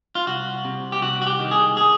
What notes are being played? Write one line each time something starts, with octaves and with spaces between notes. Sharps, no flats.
F4
C2 F#4
C3
G4
C2 F#4
F#4
G4
D#3
G#4
G#4